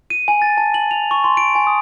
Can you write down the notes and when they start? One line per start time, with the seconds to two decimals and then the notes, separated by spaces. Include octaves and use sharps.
0.10 D#7
0.28 G#5
0.42 A6
0.58 A5
0.74 F#7
0.91 F7
1.11 C#6
1.24 C6
1.37 D7
1.55 G#5
1.67 D#6